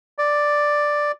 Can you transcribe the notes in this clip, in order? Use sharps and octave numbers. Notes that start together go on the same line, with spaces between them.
D5